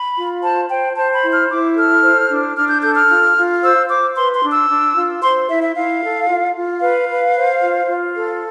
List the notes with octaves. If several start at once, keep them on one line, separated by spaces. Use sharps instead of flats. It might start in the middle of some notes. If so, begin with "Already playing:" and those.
Already playing: B5
F4
C5 A5
C5 G5
C5 A5
B5
E4
F6
E4 D6
A4 F6
C5
D4
D4 F6
G6
A4 G6
F6
F4
F4
C5 E6
C5 D6
B4 C6
C6
D4
E6
D4
F4
C5 C6
E4 E5
E5
E4 F5
A4
F4
F4
B4 F5
B4
C5
F4
F4
A4